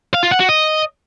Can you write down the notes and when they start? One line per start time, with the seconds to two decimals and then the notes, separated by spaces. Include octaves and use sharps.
0.14 F5
0.23 F4
0.32 F#5
0.40 F#4
0.49 D#5